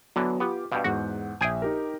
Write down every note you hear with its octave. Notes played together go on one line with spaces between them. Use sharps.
D3 E3 F#3 B3
B3 F4 G4 D6
G2 B2 F5 G6
E2 G#2 F#4 F#5
A#1 G#4 E5 G5 G#5
D#4 G4 A#4